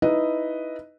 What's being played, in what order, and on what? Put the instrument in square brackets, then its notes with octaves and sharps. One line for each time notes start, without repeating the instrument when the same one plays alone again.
[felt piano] D#4 E4 B4 D#5